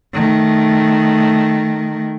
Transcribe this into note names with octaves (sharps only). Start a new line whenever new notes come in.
D#3 A3